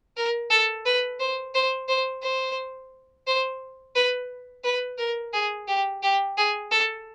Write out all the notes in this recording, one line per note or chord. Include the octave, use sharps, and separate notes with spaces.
A#4
A4
B4
C5
C5
C5
C5
C5
B4
B4
A#4
G#4
G4
G4
G#4
A4